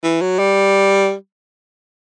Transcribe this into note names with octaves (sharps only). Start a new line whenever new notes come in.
E3
F#3
G3